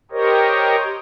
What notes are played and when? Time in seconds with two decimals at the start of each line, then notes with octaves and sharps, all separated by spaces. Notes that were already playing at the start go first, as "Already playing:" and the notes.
0.11 G4 A#4 C5 C#5 D#5